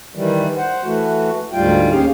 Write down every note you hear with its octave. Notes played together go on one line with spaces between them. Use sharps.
D#3 E3 G3
C5 F#5
E3 A3 F#4
D2 G#2 G3 F4 G5
D#2 C#4 G4 G#4 F5